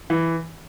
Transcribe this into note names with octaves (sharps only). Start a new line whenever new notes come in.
E3